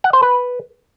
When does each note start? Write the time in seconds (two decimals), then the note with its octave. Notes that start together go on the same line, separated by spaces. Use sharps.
0.04 F#5
0.13 C5
0.22 B4